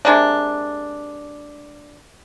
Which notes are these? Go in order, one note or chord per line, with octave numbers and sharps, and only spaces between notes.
C3 G#3 A#3 D4